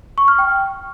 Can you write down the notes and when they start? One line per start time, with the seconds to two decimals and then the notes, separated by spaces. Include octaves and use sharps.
0.18 C#6
0.28 F6
0.38 G5